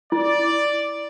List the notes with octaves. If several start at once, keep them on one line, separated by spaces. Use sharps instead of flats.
E4 D5